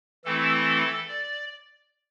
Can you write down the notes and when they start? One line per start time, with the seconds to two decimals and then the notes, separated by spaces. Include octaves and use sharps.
0.25 E3 A3 C4 E4 A4
1.08 D5